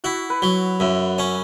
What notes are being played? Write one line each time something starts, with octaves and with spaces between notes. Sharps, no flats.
E4 F#4
B4
F#3
F#2 E5
C#4